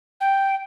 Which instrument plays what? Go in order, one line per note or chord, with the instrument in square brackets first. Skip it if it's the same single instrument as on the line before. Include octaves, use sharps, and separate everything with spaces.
[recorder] G5